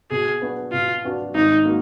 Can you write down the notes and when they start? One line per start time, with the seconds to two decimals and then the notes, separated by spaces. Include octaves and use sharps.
0.11 B2 G#4
0.42 F#3 B3 D4 F#4
0.72 B2 F4
1.04 F#3 B3 D4 F#4
1.34 G#1 D#4
1.65 F#3 A#3